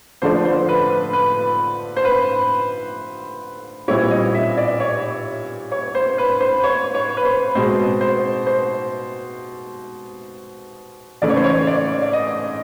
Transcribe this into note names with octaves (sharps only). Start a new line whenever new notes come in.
D3 F3 A3 D4 C5
C5
B4
B4
B4
C5
B4
A#2 G3 C4 E4 C#5
D#5
E5
D5
C#5
C#5
C5
B4
C5
C#5
C#5
B4
C5
B2 G#3 C4 C5
C5
C5
C#3 E3 A3 C#4 D5
C#5
C5
C#5
D5
D5
D#5